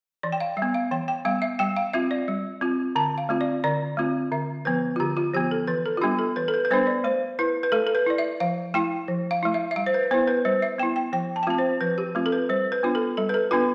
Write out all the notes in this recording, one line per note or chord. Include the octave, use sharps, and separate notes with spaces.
E3 D5
G5
F5
G3 E5
B3
F5
E3 G5
G5
G3 B3 F5
E5
G3 G5
F5
C4 F4 E5
D5
G3
C4 F4
D3 A5
F5
A3 C4 F4
D5
D3 D5
A3 C4 F4
D3 E5
F3 B3 B4
F4
D3 G4
F4
F3 B3 G4
A4
E3 B4
A4
F4
G3 B3 D4 G4
A4
E3 B4
A4
B4
B4
G3 B3 D4 C5
D5
A3 C5
E4 B4
B4
A3 A4
A4
B4
E4 D5
E5
F3 F5
A3 E4 G5
F3
F5
A3 E4
E5
E5
G3 F5
C5
B4
B3 E4 C5
B4
G3 C5
E5
B3 E4 G5
G5
F3 G5
A5
G5
A3 C4 F4 A5
C5
F3 B4
G4
A3 C4 F4
A4
B4
G3 C5
B4
B3 D4 F4
A4
G3 A4
B4
A4
B3 D4 F4 B4